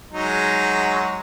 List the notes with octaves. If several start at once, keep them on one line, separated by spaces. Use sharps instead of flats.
F#3 G#3 D#4